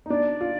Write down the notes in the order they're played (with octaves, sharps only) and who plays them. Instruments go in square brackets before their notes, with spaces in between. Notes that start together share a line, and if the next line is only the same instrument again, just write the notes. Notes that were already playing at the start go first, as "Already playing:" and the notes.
[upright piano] D#4
[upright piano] D4 [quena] D5
[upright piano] F4